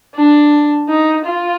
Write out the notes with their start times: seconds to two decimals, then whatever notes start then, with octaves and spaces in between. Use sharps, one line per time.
0.15 D4
0.88 D#4
1.25 F4